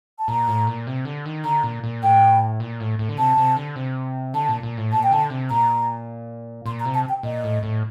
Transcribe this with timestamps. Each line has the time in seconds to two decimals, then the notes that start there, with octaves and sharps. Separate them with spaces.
0.19 A5
0.28 A#2 A#5
0.48 A2
0.67 A#2
0.87 C3
1.05 D3
1.26 D#3
1.44 D3 A#5
1.63 A#2
1.84 A#2
2.03 A2 G5
2.60 A#2
2.80 A2
2.99 A2
3.09 D3
3.18 C3 A5
3.37 C3
3.56 D3
3.76 C3
4.34 D3 A5
4.49 A#2
4.63 A#2
4.77 A2
4.92 A#2 A5
5.03 G5
5.11 D3 A5
5.30 C3
5.50 A#2 A#5
6.65 A#2 C6
6.80 A#5
6.85 C3
6.94 A5
7.09 G5
7.23 A#2 D#5
7.44 A2
7.63 A2